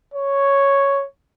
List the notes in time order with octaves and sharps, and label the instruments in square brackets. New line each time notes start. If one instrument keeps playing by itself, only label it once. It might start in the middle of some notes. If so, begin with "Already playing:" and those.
[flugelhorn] C#5